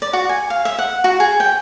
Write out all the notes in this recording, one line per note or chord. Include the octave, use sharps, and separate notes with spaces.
D5
F#4
G#5
F5
E5
F#5
F#4
G#4
G5